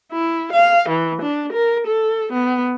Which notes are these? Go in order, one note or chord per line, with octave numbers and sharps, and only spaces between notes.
E4
F5
E3
D4
A#4
A4
B3